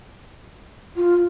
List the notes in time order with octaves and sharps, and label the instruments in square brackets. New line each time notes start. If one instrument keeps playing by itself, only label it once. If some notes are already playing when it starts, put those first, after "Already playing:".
[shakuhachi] F4